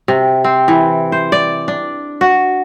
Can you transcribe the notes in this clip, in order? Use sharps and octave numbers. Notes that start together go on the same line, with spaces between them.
C3
C4
E3
C5
D5
D4
F#4